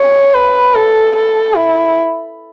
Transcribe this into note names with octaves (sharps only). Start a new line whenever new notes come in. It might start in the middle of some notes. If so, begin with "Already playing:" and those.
Already playing: C#5
B4
A4
A4
E4